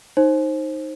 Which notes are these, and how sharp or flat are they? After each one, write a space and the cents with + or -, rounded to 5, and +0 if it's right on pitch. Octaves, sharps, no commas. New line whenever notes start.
D#4 +0 C5 +20